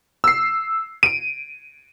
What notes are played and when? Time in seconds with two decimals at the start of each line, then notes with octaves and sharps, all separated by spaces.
0.24 E6 C7
1.03 D7 D#7